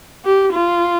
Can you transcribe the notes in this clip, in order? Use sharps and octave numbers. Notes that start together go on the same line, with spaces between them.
G4
F4